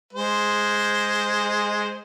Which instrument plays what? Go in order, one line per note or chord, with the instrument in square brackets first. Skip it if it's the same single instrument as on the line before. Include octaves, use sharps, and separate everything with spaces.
[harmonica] G#3 C5